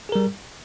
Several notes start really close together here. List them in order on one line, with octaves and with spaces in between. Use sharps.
G#4 A#4 G3